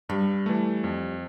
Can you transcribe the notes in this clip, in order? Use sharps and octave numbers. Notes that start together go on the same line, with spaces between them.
G2 G3
E3 A3
F2